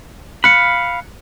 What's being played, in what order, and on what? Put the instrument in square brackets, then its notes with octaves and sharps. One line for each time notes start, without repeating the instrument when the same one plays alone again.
[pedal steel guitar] F5 B5 [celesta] F#6 C#7